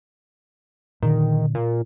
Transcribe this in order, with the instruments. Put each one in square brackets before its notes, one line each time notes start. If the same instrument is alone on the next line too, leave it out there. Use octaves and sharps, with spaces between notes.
[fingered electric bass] A#2 D3 [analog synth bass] D#3
[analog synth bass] A#2